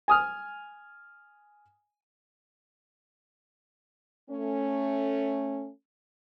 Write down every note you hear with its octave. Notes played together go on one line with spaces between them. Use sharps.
G#5 D#6 F6
A3 C#4